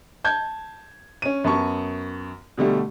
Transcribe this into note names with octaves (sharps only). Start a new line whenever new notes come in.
A5 G6 G#6
C#4 D#7
F#2 B3 A5 C#6
B2 D3 G3 A3